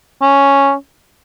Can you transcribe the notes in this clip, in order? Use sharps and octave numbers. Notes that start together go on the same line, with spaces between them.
C#4